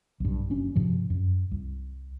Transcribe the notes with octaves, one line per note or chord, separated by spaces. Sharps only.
B1 G2
F#1 F#2 C#4 D4
G2 C3 F3
F#2
C2